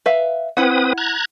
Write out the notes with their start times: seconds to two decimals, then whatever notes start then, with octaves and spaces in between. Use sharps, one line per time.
0.06 B4 E5 F5
0.57 C4 E4 B4 F#5 D#6
0.98 A#5 F#6 G#6